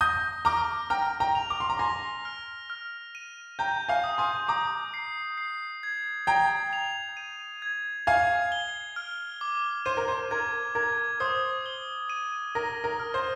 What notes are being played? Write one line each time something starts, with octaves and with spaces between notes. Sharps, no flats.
D#6 G6 A#6
A#5 D6 F6
G5 A#5 F6
G5 A#5
F7
D6
C6
A#5
G#5 C6 A#6
F6
F6
D#7
G5 A#5 G6
F5 G#5
D#6
G#5 C6
A#5 D6 D#6
C7
C7
G#6
G5 A#5 G#6
F7
D#7
G#6
F5 G#5 G#6
G7
F6
D6
C5 D#7
A#4
C5
A#4 G#6
A#4 G#6
C5 D#6
G7
D#7
A#4 A#6
A#4
F6
C5